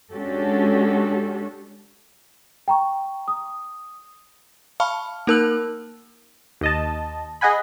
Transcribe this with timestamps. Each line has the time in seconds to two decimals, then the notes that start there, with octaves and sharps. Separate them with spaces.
0.12 G#3 C#4 D4 F#4 G4 A4
2.68 G5 A#5 C#6
3.28 D#6
4.80 F5 A5 B5 C#6 F6
5.27 A#3 D#4 A#4 A5 E6 F#7
6.61 D#2 D#5 A5
7.41 G#4 D#5 F#5 G#5 B5